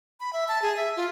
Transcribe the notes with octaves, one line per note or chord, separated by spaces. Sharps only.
B5
E5
A5
G#4
E5
F4